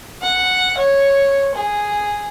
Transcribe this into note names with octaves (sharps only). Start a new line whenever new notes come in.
F#5
C#5
G#4